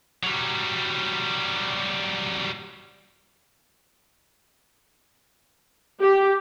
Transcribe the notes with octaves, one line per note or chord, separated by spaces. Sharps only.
F#3 G3
G4